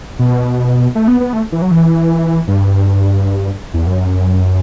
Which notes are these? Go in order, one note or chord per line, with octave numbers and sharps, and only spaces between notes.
B2
A3
B3
B3
A3
E3
F#3
E3
G2
E2
F#2